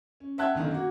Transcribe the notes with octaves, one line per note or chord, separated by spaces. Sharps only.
C#4
E5 F#5 G5 A5 F#6 G#6
B1 F#2 D3 D#3
A#3 F#4